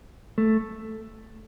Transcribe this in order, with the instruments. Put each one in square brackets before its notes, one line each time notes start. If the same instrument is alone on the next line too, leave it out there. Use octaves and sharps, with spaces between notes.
[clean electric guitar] A3